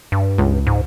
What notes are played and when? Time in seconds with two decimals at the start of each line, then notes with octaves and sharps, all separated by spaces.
0.12 G2
0.38 C#2
0.67 G#2